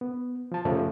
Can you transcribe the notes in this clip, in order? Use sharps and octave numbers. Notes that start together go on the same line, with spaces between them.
B3
F3 A5
F#2 C#3 F3 A3